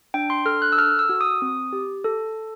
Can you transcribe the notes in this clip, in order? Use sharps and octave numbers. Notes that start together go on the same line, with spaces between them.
D4 G5
C6
A4 F6
F#6
E6
A4 F6
E6
F#4
D#6
C4
G4
A4